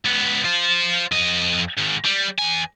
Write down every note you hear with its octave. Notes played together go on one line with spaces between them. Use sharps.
C#2 B3
F4 C5
F2 D#5
G#2 D#3
G3
E2 G#5